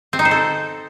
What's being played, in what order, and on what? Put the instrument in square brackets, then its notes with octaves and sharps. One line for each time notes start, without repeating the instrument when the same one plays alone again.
[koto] C4
D#4
C5
A4